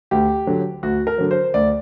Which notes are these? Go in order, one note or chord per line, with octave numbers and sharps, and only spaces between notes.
D2 G4
D3 F#3
D2 F#4
A#4
D3 F#3
C5
D2 D5